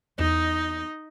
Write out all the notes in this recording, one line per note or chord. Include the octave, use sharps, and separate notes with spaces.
E2 B3 D#4 D#5